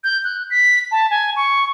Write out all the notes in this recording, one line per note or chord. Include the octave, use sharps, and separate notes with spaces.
G6
F#6
B6
A5
G#5
C#6